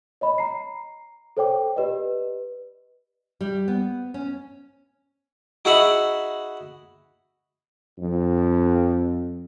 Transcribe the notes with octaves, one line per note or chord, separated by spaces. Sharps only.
C#5 D#5 B5
A#5 C7
A4 C5 C#5 G5 D6
G4 B4 D5 D#5
G3
B3
C#4
D#4 F#4 G#4 E5 F#5 B5
F2